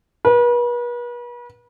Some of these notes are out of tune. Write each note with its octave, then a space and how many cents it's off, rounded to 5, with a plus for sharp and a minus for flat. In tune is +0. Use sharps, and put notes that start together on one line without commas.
B4 -40